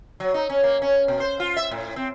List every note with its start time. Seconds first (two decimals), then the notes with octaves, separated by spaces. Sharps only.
0.20 F#3
0.34 D#4
0.50 C#4
0.63 A#3
0.82 C#4
1.08 B2
1.20 C5
1.40 F4
1.57 E5
1.71 A2
1.96 C4